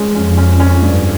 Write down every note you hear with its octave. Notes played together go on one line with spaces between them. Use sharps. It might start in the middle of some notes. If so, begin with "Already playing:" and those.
Already playing: G#3 C#4
F2 C#4
C#4
C#4
G2